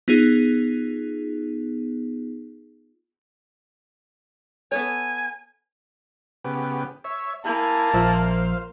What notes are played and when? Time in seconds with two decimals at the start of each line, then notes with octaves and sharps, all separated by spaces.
0.08 B3 D#4 F4 G#4
4.72 B3 A4 C#5 G#5
6.44 C#3 B3 G4
7.04 C#5 E5
7.45 A#3 E4 G#5 A5
7.94 A#1 F3 C5 E5 F5